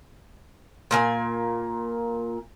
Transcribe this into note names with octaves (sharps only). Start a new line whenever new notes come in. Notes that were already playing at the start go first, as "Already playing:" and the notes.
A#2 A#3 G#5